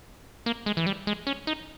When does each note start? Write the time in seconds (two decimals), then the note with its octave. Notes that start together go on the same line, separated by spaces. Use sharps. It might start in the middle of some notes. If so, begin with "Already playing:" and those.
0.46 A#3
0.66 G#3
0.77 E3
0.86 G3
1.07 G#3
1.27 C#4
1.47 D#4